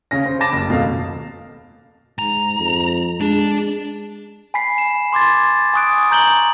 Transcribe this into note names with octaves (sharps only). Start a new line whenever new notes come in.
C#3 C#4 A#6
C5
A5 B5 D6 A6 A#6 E7
F#1
D#1 B2 A3 F5
G#2 A#5
F2
G#3 D4
G#5 B5 B6 C7
E7
C6 D6 G#6 A6
G#5 C#6 D#6 F#6 D7
A#5 G6 F#7 G7